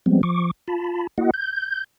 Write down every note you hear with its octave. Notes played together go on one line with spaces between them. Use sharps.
F3 G3 G#3 B3 C4
F3 C#6 D6
F4 A5 B5
A#3 E4 F#4 D#5 F#5
G6